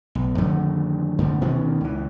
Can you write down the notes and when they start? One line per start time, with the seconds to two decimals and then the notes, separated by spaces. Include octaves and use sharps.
0.15 B1
0.38 F2 D3 D#3 A3
1.18 F2 D3 A3
1.41 D2 B2 D#3 C#4
1.81 C#2 E3